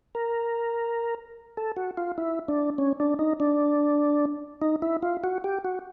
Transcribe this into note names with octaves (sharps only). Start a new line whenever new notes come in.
A#4
A4
F#4
F4
E4
D4
C#4
D4
D#4
D4
D#4
E4
F4
F#4
G4
F#4